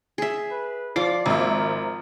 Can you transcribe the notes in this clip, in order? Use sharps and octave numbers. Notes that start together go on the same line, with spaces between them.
G#4 E5
B4
F3 D5 D6 C7
G#1 A#3 E5
A#4